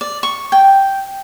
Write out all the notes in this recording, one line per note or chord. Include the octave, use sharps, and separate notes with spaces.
D5
C#6
G5